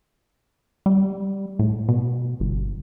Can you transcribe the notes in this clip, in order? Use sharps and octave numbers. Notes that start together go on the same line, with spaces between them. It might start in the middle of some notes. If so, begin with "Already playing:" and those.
G3
A2
B2
G1